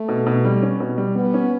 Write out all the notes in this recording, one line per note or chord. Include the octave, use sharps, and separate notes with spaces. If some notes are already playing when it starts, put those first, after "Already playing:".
Already playing: A3
B2
B2
G3
C#4
B2
G3
G3 B3
C#4